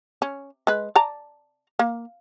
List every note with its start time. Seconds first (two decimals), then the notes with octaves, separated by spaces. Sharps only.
0.22 C#4
0.67 G#3 B4
0.96 D5 A5 A#5
1.79 A#3